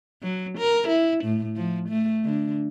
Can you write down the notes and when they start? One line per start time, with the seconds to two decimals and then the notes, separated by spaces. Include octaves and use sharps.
0.22 F#3
0.58 A#4
0.88 E4
1.24 A2
1.56 F3
1.89 A3
2.24 D3